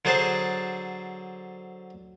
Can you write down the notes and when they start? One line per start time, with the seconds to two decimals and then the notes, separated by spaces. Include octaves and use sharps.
0.05 D3 F#3 G#4 C5 A5